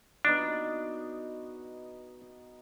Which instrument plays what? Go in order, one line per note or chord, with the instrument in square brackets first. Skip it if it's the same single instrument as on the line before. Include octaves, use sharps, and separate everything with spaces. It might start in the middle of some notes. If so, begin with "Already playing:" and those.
[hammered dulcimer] B3 D#4 F#4 [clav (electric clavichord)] D4